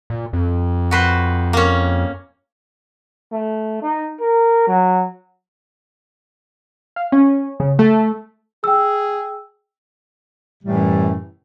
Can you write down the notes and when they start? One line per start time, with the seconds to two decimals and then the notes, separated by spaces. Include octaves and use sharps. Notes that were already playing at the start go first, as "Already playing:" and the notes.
0.10 A#2
0.33 F2
0.91 F#4 B4 C5
1.53 A#3 C#4
3.32 A3
3.82 D#4
4.20 A#4
4.68 F#3
6.96 F5
7.12 C#4
7.60 C#3
7.79 A3
8.64 G#4 G5 E6
10.64 F#2 A2 C3 E3 G3 A3